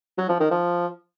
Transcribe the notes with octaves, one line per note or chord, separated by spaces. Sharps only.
F#3
F3
D#3
F3